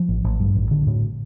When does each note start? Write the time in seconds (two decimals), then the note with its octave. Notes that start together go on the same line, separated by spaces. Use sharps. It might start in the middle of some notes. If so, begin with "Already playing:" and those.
Already playing: F3
0.09 A1
0.24 A1
0.40 G2
0.55 A1
0.71 D3
0.87 A2